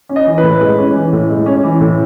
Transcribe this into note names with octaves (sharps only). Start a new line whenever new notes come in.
C#4
D#5
E3
B4
A2
G#3
C#4
E3
A2
G#3
C#4
E3
A2